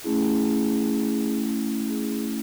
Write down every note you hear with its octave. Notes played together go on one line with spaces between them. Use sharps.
A3 C#4 E4 G#4
G#4